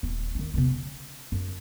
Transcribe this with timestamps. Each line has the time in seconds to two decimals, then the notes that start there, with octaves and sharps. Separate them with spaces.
0.03 D#1
0.35 D#3 C#4
0.54 C3 B3
0.70 C#4
1.32 F#2